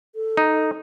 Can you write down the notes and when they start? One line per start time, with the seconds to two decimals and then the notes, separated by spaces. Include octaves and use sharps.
0.15 A4
0.37 D#4